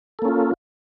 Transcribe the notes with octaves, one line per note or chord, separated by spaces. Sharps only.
A#3 C#4 F4 A4